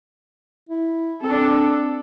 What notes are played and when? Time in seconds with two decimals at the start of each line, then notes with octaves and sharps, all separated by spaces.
0.69 E4
1.23 C4 D4 A4